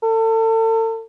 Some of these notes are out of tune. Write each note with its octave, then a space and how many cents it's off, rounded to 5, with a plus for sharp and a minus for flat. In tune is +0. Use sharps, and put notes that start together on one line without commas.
A4 +35